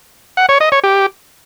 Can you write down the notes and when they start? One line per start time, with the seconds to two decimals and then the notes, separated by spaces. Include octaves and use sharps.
0.37 F#5
0.49 C#5
0.60 D#5
0.72 C#5
0.84 G4